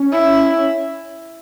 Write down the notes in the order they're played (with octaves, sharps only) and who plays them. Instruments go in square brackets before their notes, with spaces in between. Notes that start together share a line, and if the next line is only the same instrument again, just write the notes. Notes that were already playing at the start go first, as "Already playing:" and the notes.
Already playing: [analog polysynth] C#4
[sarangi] E4